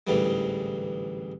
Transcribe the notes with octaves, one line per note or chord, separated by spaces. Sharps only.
A1 D2 G#2 E3 G3